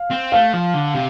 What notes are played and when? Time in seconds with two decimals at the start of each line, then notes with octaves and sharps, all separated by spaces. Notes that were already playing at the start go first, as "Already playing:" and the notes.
Already playing: F5
0.11 C4
0.32 A3 F5
0.53 F3
0.74 D3
0.95 C3